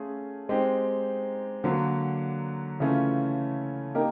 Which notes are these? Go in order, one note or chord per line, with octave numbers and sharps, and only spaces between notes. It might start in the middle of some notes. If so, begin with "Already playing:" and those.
Already playing: A3 C#4 F4 G#4
G#3 C4 D#4 G4
D3 F#3 A#3
C#3 E3 A3 C#4 F4
A#3 D#4 G4 A#4